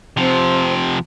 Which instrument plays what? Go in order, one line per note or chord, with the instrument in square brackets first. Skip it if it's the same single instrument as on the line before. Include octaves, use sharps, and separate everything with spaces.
[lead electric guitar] C3 F3 [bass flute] C4